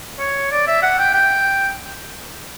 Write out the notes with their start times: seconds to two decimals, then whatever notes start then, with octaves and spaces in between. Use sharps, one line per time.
0.18 C#5
0.51 D5
0.67 E5
0.83 F#5
0.99 G5
1.14 G5